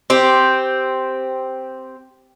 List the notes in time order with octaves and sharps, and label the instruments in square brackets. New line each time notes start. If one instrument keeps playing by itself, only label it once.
[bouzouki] C4 G4